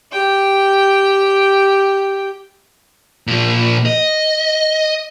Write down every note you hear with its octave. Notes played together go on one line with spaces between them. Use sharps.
G4 G5
A#2 F3
D#5